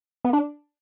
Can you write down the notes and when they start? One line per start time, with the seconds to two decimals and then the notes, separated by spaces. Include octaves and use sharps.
0.24 B3
0.33 D4